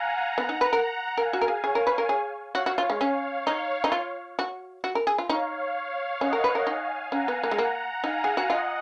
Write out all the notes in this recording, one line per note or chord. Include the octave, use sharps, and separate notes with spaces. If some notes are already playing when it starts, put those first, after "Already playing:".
Already playing: F5 F#5 G#5 A#5
F#5 A#5
B3
D#4
B4
A#4 F#5 A#5
A#4 F5 G#5
F#4
A#4
G#4
G#4 C#5 F5
A#4
B4
A#4
G#4
F#4 C#5 F5
F#4
F4
G#3
C#4
D#4 C#5 F5
D#4
F4
F#4
F#4
A#4
G#4
F4
D#4 C#5 F5
C#4 D#5 F#5
A#4
B4
A#4
D#4 F5 G#5
C#4 F#5 A#5
B3
A#3
G#3
A#3
D#4 F5 G#5
G#4
F#4
F4 D#5 F#5